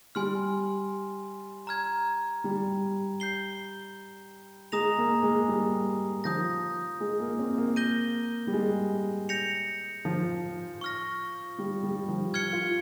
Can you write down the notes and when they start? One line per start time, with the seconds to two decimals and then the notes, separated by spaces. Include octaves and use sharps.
0.15 G3 G#5 C6 F6
1.67 A#5 F6 G#6
2.44 G3
3.20 G6 C7 G7
4.72 G#3 A#5 D#6 A#6 F7
4.98 A#3
5.23 G#3
5.48 G3
6.24 F3 D#6 G6 A#6
7.00 G#3
7.20 A#3
7.39 C4
7.58 A#3
7.76 G6 A#6 D#7 G7
8.47 G3
8.54 G#3
9.29 G6 A#6 C#7 F7
10.05 F3
10.81 C#6 F6 A#6
11.58 G3
11.83 G3
12.08 F3
12.34 F6 G#6 C#7 G7
12.53 F4